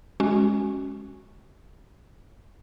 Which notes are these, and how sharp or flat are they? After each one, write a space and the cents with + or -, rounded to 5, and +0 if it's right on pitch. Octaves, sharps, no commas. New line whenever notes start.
G#3 +0 C#4 -5 F#4 +10